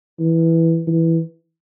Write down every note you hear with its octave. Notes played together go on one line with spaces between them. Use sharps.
E3
E3